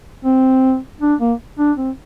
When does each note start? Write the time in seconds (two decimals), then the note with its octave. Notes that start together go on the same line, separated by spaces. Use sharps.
0.25 C4
1.01 D4
1.20 A#3
1.59 D4
1.77 C4